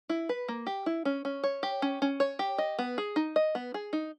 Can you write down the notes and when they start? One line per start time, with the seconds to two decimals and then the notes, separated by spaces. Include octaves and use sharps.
0.09 E4
0.29 B4
0.48 A#3
0.67 G4
0.86 E4
1.05 C#4
1.25 C#4
1.44 C#5
1.63 G4
1.82 C#4
2.02 C#4
2.20 C#5
2.39 G4
2.58 D#5
2.79 B3
2.98 G#4
3.16 D#4
3.36 D#5
3.55 B3
3.74 G#4
3.93 D#4